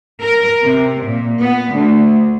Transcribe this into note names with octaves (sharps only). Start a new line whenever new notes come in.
A#4
C3
A#2
B3
D2